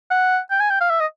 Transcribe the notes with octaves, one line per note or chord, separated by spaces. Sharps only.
F#5
G5
G#5
G5
F5
E5
D#5